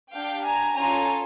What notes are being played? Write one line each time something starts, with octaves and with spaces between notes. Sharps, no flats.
D4 G4 F5 G5
G#5 A#5
C#4 F4 A4 G#5 A#5